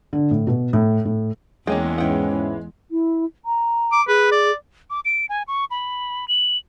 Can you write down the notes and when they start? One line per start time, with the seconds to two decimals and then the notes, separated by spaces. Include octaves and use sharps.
0.13 D3
0.31 A2
0.47 B2
0.73 A2
1.05 A2
1.67 E2 G#3 A#3 C#4 G5
1.98 G#2 E3 C#4 F#5 G5
2.91 E4
3.45 A#5
3.92 D6
4.08 G#4 B4
4.31 D5
4.90 D6
5.05 D7
5.29 G#5
5.48 C#6
5.71 B5
6.28 F#7